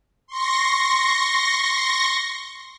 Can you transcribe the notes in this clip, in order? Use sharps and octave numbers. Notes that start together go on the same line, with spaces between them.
C6 C#6 A#6